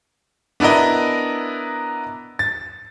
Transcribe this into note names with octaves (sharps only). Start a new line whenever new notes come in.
B3 D4 E4 A#4 D#5
A6